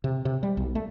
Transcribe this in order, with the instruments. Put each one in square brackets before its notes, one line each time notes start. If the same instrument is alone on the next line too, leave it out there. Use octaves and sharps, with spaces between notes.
[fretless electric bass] C3
C3
G3
B1
A3